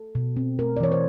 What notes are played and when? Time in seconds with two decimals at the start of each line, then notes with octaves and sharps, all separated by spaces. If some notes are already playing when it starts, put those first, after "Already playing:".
Already playing: A4
0.15 B2
0.36 C4
0.59 A3 A#4
0.76 D5
0.80 E3 C#5
0.92 C5